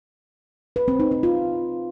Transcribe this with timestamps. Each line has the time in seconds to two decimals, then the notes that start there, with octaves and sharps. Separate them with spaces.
0.76 B4
0.88 C4
1.00 D#4
1.11 C4
1.23 F4